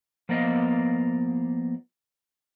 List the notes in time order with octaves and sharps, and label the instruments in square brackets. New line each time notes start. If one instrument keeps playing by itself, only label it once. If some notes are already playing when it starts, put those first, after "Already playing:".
[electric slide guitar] F3 A#3 B3 D5 D#5 F5